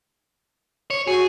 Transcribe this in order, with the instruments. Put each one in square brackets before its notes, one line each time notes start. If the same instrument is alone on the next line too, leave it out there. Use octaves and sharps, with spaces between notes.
[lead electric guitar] C#5
[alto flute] F#4 [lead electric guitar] G#4